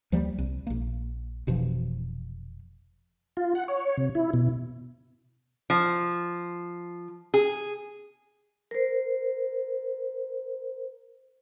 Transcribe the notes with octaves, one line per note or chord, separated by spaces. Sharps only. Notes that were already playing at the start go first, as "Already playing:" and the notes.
D2 F3 G3 A#3
C2
A#1 A#3
F1 B2 E3 F3
F4
F#5
C#5
C3
E4
B2
F3
G#4
A#4 C5